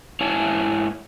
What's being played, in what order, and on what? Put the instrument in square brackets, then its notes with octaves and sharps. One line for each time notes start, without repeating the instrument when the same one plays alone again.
[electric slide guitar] G#2 E4 C#5 E5 G#5 A5